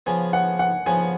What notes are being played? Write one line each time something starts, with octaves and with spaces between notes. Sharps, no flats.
C#3 F3 B3 G#5
F#5
F#5
C#3 F3 B3 G#5